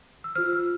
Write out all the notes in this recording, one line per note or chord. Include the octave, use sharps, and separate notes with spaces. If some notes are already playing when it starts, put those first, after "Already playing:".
E6
F4 C5 F6
E6